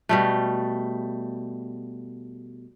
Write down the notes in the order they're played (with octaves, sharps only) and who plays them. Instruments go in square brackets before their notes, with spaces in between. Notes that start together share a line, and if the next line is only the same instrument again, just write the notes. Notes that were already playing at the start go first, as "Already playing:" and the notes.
[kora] B2 G3 A3